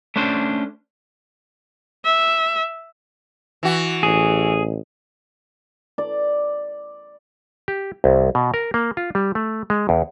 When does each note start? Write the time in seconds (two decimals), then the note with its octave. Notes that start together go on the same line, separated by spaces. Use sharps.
0.16 A3 C#4 D4 C5
2.05 E5
3.63 E3 F#4
4.03 A1 G#4
5.98 D5
7.68 G4
8.04 C2
8.35 B2
8.54 A#4
8.74 A#3
8.97 F4
9.15 G3
9.35 A3
9.70 G#3
9.89 E2